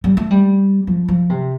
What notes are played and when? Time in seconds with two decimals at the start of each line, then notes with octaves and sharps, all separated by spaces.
0.04 G3
0.17 A3
0.30 G3
0.87 F3
1.08 F3
1.30 C3